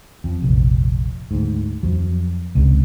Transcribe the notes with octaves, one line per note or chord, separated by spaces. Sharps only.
F2
F1 A#1
D2 G#2
F2 F#3
G1 C#2 C3